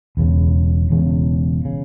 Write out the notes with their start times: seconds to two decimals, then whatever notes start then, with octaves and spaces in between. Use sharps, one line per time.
0.17 E1 E2 C#3
0.90 E1 E2 C#3
1.65 C#3